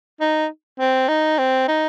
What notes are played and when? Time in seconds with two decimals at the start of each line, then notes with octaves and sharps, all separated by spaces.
0.21 D#4
0.79 C4
1.09 D#4
1.38 C4
1.68 D#4